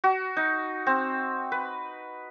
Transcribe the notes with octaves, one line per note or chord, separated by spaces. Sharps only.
F#4
D#4
C4
B4